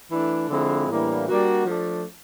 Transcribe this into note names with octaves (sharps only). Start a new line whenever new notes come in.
E3 A3 D4
D3 F3 G#3 C4 E4
A2 E3 G3 A#3 D4
G3 A#3 D4 F#4
F3 A3 D4